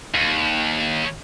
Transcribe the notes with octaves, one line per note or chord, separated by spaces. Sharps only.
D#2